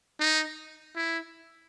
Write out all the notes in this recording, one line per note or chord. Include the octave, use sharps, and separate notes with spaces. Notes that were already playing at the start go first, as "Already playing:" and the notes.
D#4
E4